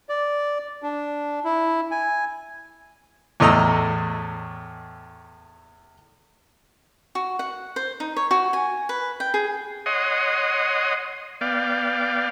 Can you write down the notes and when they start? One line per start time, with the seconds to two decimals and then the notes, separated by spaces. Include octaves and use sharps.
0.09 D5
0.83 D4
1.45 E4
1.91 G#5
3.40 E2 A2 A3 D#5 A#5 E6
7.15 F#4
7.39 F#5
7.76 C5
8.00 D#4
8.16 C#5
8.31 F#4
8.53 G#5
8.89 B4
9.20 G5
9.34 G#4
9.86 C#5 D#5 F#5 C6 D#6
11.41 B3 D5 F5 G5